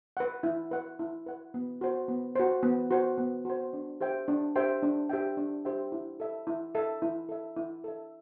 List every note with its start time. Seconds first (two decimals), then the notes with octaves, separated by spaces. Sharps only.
0.17 B4 F#5
0.43 E4
0.71 B4 F#5
0.99 E4
1.26 B4 F#5
1.54 B3
1.81 F#4 C5
2.08 B3
2.35 F#4 C5
2.63 B3
2.91 F#4 C5
3.18 B3
3.45 F#4 C5
3.73 D4
4.01 G4 C5 E5 G5
4.28 D4
4.56 G4 C5 E5 G5
4.83 D4
5.09 G4 C5 E5 G5
5.37 D4
5.65 G4 C5 E5 G5
5.92 E4
6.20 A4 E5
6.47 E4
6.75 A4 E5
7.02 E4
7.29 A4 E5
7.56 E4
7.84 A4 E5